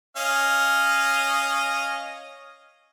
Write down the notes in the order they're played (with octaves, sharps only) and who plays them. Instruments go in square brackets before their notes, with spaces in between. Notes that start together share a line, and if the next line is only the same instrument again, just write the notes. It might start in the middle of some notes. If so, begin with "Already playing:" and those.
[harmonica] C#4 D#5 F5